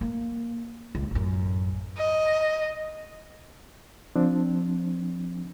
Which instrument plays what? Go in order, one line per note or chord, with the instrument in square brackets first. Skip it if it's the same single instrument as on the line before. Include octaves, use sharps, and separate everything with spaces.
[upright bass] A#3
C#2
A1 F#2
[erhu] D#5
[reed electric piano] F3 C4 D4